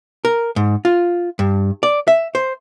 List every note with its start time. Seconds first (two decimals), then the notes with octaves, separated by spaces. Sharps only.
0.25 A#4
0.56 G#2
0.85 F4
1.39 G2
1.83 D5
2.08 E5
2.35 C5